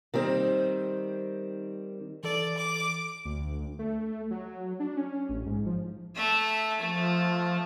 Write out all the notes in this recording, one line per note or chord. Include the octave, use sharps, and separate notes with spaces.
D#3 G3 C4
E3 A4 D5
D6
D2
A3
F#3
D4
C#4
A1
G#2
F3
A3 E5
F3 A3